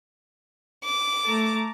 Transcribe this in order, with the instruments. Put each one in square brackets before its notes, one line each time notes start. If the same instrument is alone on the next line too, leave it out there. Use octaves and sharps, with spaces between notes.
[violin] D6
[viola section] A3 A5 A#5